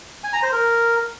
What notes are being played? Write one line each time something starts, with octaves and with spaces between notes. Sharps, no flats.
G#5
A#5
C5
A#4